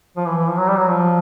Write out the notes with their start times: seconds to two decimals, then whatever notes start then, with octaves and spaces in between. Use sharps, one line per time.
0.17 F3
0.26 E3
0.37 E3
0.48 F3
0.58 F#3
0.68 G3
0.78 F#3
0.89 F3